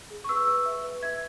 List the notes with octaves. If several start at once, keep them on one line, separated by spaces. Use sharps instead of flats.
G#4
C#6
B4 E6
B4 E6
E5
B4
E5 G#6